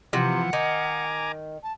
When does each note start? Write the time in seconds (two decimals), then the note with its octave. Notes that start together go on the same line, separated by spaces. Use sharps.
0.13 C3 E3 F3 F#5
0.53 D#3 G#5 A#5 D6
1.63 A5